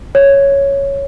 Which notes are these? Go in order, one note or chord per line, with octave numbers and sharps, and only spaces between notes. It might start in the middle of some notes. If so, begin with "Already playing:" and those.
C#5